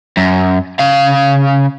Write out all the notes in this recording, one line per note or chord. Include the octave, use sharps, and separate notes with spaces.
F#2
C#3 F5